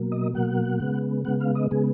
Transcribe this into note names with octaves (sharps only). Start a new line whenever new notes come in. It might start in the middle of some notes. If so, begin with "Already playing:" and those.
Already playing: B2 F#3 A#3
D#5
B2 F#3 A#3 F#5
C#3 G#3 B3
C#3 G#3 B3 F#5
F5
D#5
C#3 G#3 B3 G#4